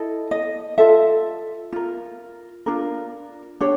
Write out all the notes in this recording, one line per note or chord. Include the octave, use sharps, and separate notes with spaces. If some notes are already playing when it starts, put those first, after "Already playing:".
Already playing: E4 A4 D#5
D#5
F4 A4 E5
F4 A#4
D4 F4 A#4
D4 G4 C#5